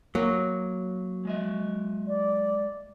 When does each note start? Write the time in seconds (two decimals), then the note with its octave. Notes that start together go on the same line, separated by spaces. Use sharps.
0.15 F#3 A#3
1.25 G#3 D#5 E5
2.08 D5